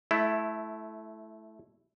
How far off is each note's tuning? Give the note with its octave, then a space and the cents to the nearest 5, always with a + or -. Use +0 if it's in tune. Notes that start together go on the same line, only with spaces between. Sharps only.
A3 -20 E4 +5